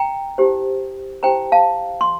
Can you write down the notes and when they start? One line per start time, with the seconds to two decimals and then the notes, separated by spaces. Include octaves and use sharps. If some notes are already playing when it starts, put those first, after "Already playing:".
Already playing: G5 A#5
0.38 E4 G4 C5
1.23 E4 G4 C5 G5 A#5
1.52 F5 A5
2.01 C6